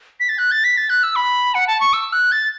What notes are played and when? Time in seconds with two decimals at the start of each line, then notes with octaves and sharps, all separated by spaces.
0.20 B6
0.29 A6
0.38 F#6
0.51 A6
0.64 B6
0.77 A6
0.90 F#6
1.03 E6
1.16 B5
1.55 F#5
1.67 A5
1.80 C#6
1.93 E6
2.13 F#6
2.32 A6